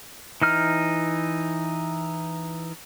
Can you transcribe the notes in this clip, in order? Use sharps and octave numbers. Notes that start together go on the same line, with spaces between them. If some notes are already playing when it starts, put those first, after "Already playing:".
E3 D#4 F6